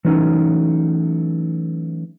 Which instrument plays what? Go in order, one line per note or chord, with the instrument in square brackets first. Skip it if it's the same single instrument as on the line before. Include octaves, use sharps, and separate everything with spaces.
[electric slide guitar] E3 F#3 A3 C#4 D#4